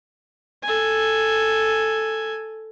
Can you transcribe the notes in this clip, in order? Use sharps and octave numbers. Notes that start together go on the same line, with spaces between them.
A4 G#5